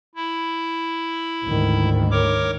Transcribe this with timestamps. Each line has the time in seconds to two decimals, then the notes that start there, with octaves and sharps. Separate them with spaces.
0.15 E4
1.44 D2 G#2 D#3
2.11 A#4 C#5 D6